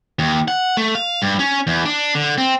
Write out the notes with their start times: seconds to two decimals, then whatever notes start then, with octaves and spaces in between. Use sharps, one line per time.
0.19 D#2
0.48 F#5
0.77 A3
0.95 F5
1.22 G2
1.39 C#4
1.67 E2
1.85 D4
2.15 D3
2.38 C4